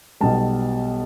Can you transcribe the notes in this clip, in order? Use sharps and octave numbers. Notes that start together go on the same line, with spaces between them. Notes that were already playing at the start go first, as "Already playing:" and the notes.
B1 B2 G3 A5